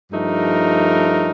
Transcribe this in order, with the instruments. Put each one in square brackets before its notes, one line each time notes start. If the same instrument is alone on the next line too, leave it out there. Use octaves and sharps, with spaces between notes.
[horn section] G2 F3 A3 D#4 A#4